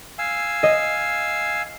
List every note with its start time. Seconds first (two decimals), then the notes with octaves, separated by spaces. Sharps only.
0.19 F5 G#5 E6
0.63 D#5